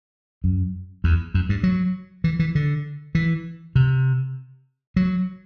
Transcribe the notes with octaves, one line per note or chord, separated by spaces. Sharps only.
F#2
E2
F#2
G2
F#3
E3
E3
D3
E3
C3
F#3